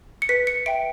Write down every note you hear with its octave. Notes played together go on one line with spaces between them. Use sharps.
C#7
B4 B6
C#7
E5 G5 D7